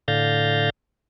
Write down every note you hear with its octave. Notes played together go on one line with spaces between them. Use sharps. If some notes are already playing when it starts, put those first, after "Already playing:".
A2 D3 F5 G6 A6 A#6